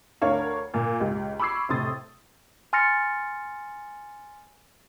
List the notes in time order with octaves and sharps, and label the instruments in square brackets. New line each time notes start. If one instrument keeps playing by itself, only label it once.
[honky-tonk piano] D2 D4 A#4 C#5 F5
A#2 A#3
C#2 G4
B5 C#6 D6 E6 G#6 C7
F1 A2 C3 C6 D#6 A6
[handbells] G#5 C6 F6 A6 A#6 C#7